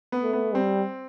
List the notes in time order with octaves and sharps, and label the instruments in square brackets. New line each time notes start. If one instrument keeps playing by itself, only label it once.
[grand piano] B3
[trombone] A3
[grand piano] B3
[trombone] G3 [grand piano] C4